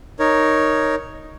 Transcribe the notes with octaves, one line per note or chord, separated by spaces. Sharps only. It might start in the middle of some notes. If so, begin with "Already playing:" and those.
D#4 A#4 C#5